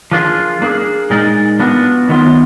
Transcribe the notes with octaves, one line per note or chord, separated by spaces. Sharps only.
F3 A#3 D4 F4 G#4
A#3 D4 G#4
A#2 G#3 D#4 A#4 D5
F3 B3 D4 F#4
D#3 F#3 B3 F4